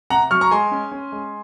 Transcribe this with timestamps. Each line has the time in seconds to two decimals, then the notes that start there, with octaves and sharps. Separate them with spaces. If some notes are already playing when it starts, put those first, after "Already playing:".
0.10 C3 F#5 A#5
0.31 F#3 C#6 F6
0.41 A#5 C#6
0.51 G#3 G#5 C6
0.71 C#4
0.92 C#4
1.12 G#3